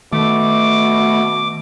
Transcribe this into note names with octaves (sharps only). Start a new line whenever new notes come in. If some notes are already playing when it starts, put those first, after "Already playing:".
B2 D#3 A3 D6